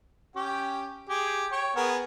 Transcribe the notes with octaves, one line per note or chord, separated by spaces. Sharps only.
C#4 G4 G5
G4 G#4
C#5 G5
B3 G#4 A#4